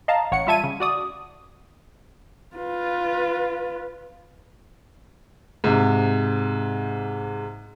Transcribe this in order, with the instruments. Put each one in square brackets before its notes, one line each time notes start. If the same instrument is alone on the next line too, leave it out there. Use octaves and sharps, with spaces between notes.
[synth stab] D#5 F5 A5 A#5
A1 C#5 F#5 C#7
G3 F4 E5 A5 G#6 D#7
C#3
F#4 D5 D#6
[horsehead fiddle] F4 B4
[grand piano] G#2 C3